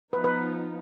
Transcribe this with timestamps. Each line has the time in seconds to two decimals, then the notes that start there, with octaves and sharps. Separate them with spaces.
0.13 F3 B3 D#4 B4
0.24 B4